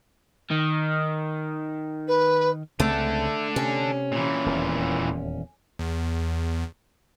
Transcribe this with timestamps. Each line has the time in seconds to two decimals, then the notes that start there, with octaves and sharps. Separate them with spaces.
0.51 D#3
2.07 B4
2.80 C#2 C#3 A3 C4 D4 A4
3.56 C3 C#4
4.12 A#2 E3
4.46 D#1 E2
5.79 E2